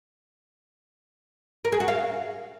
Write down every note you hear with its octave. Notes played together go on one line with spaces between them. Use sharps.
A#4
G#4
F#4
F5